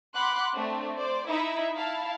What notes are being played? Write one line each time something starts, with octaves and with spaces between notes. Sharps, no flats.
F#5 B5 C6 D6 F#6
A3 C4 D4
C5 D5
D#4 E4 E5
E4 F5 A5